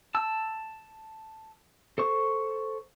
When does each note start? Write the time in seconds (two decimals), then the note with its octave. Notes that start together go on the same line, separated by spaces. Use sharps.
0.15 A5 E6
1.98 A4 C5 C#6